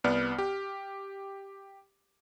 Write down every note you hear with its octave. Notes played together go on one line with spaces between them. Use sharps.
C2 B3 D5 F6
G4